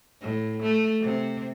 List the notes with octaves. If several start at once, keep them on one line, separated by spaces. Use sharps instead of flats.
A2
A3
C3